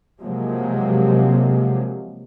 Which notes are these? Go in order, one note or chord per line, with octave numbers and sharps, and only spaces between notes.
C3 F3 F#3 G#3 A#3